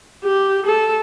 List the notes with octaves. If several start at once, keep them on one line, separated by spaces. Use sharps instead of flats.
G4
A4